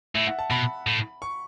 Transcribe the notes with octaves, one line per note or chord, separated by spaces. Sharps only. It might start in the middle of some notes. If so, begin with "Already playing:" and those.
A2 E5
F#5
A5
B2 B5
A2
C#6